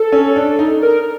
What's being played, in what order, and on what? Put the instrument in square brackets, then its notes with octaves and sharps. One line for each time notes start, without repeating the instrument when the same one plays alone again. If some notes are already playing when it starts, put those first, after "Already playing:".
Already playing: [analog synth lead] A4
[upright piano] C#4
D4
D#4
[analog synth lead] A#4